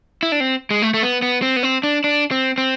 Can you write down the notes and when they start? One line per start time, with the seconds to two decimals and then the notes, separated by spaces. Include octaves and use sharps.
0.23 E4
0.32 D4
0.40 C4
0.71 G#3
0.82 A3
0.94 A3
1.02 B3
1.22 B3
1.42 C4
1.56 B3
1.63 C4
1.83 D4
2.04 D4
2.31 C4
2.58 C4